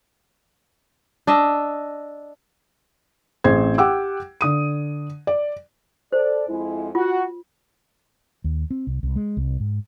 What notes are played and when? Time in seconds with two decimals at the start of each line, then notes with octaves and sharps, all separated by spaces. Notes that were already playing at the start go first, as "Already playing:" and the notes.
1.27 D4 D#5 E5
3.44 A1 C4 G#4 C5 G#6
3.78 G4 F#5 G5 D6 E6
4.41 D3 D#6 D#7
5.27 D5
6.13 A4 C5 D5
6.48 F2 G#3 E4
6.95 F4 F#4
8.44 D#2
8.71 C4
8.87 C2
9.03 C2
9.16 G#3
9.37 C2
9.60 G#2